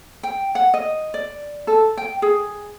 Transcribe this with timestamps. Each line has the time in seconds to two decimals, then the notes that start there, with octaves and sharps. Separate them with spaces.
0.23 G5
0.55 F#5
0.74 D#5
1.14 D5
1.67 A4
1.98 G5
2.22 G#4